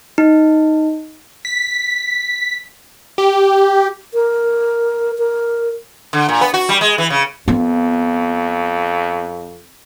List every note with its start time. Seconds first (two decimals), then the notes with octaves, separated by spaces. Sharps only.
0.18 D#4
1.45 B6
3.18 G4
4.14 A#4
5.18 A#4
6.13 D3
6.29 A#2
6.41 B3
6.54 F#4
6.69 G3
6.81 G#3
6.98 E3
7.10 C#3
7.48 F2 B3 F4